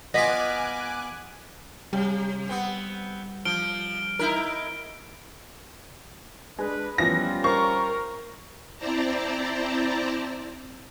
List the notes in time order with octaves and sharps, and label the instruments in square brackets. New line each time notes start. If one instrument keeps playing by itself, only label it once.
[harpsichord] B3 F4 [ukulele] D#5 [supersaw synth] G#5 D6 F#6 [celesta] A#6 B6
[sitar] C3 [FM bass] G3
[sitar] B3 C4
[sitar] F3 [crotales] F6 D7 G7
[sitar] D#4 E4 A#4
[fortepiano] G#3 [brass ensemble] D4 B4
[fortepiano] E3 F3 B3 [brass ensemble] G3 C#4 F4 [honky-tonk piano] A#6
[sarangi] A#4 [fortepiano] C5 [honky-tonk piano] C#6
[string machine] C4 E4 C5 D5 A5 A#5